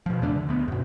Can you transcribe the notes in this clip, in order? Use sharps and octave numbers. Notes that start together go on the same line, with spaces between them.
B2 F3
E2 C#3 A3 D4
D3
D2 B3
F#2 B2